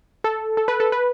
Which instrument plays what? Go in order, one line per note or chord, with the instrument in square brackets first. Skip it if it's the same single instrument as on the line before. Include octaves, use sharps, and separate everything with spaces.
[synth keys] A4
A4
B4
A4
B4